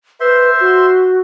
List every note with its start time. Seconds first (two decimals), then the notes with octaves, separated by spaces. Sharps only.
0.20 B4 C5 E5 C6
0.60 F#4